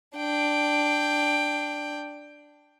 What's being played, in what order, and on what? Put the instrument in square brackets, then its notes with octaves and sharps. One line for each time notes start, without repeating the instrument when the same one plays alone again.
[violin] D4 G5